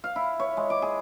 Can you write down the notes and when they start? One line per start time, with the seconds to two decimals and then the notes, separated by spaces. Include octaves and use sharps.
0.04 F5
0.16 E4
0.39 C#5
0.57 G#3
0.70 D6
0.82 G#4